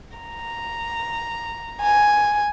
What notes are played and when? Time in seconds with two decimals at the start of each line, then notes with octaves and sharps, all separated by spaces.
0.17 A#5
1.82 G#5